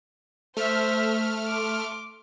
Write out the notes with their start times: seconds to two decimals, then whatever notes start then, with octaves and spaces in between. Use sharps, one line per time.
0.57 A3 C5 E5 F6
1.48 C6 D6